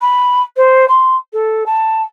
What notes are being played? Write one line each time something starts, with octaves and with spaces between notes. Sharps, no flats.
B5
C5
C6
A4
A5